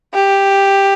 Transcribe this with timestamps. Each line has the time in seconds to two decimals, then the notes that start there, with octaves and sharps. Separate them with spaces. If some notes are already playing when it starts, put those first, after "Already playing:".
0.14 G4